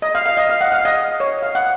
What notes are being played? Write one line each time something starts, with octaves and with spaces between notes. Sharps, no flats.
D#5
F5
F5
D#5
F5
F#5
F5
D#5
C#5
F5
F#5